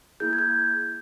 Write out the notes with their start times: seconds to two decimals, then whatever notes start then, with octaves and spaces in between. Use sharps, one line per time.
0.20 A#3 E4 G#4 G6
0.33 G#6
0.39 G6